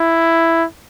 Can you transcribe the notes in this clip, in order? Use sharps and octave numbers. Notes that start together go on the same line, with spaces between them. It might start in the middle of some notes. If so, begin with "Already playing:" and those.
Already playing: E4